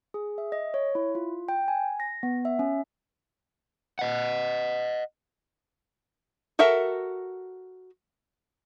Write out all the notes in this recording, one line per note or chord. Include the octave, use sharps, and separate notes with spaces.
G#4
E5
D#5
C#5
E4
F4
G5
G#5
A#6
B3
E5
C#4
D#5 F#5
F#4 A4 A#4 E5